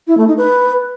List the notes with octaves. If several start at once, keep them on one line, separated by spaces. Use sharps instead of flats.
E4
A3
D#4
B4